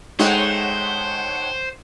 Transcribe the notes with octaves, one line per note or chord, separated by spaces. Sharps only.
G#3 A3 D#4 C5 C#5 F#5 G5